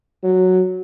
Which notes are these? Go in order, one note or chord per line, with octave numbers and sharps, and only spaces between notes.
F#3